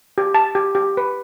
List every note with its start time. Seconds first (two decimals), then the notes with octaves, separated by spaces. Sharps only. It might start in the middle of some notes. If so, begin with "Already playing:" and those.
0.18 G4
0.34 A5
0.55 G4
0.75 G4
0.97 B4